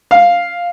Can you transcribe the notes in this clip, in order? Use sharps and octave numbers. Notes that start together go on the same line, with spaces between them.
F5